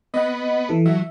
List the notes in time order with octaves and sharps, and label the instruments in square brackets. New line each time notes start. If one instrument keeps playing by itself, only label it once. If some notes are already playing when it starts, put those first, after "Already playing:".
[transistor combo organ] B3 [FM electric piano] D#5 F#5
[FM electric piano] E3 A4
[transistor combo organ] F#3 [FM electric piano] E5